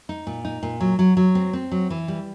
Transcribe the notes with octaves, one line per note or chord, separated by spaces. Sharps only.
D#4
A#2
D#4
A#2
F#3
F#3
F#3
C4
C4
F#3
E3
G3